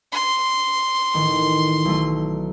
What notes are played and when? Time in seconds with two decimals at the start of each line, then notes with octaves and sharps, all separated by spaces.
0.12 C6
1.14 A1 D#3
1.85 B1 A3